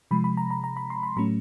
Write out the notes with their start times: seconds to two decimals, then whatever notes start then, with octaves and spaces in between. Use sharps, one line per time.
0.11 C3 F3 G#3 B5
0.24 B5
0.37 A#5
0.51 A#5
0.64 A#5
0.77 B5
0.90 C6
1.03 B5
1.16 A2 F#3 A3 C#4 B5